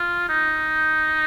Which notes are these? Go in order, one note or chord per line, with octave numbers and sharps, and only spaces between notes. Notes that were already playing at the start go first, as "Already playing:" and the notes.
Already playing: F4
D#4